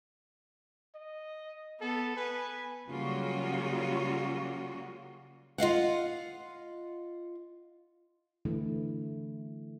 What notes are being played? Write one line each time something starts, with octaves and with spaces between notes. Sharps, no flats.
D#5
B3 A4
B4 G#5
C#3 F#3 G3 A#3 F4 F#4
F4 D#5 F5 F#5
D3 E3 A3 E4